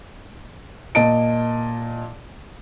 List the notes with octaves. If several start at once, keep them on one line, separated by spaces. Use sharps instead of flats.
A#2 D#5 A5 D7